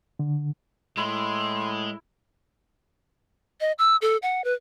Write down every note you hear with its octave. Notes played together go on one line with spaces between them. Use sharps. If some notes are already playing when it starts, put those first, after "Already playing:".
D3
A2 G#3 E4 C6
D#5
E6
A4
F#5
B4